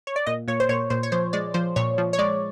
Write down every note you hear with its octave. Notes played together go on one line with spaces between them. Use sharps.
C#5
D5
A#2 D#5
A#2 C#5
C5
A#2 C#5
A#2 C5
C#5
F3 C5
G#3 D5
F3 C5
A#2 C#5
F3
C#5
G#3 D5